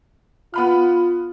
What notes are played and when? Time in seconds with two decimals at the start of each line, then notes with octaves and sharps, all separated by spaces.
0.54 B3 F4 B5 F6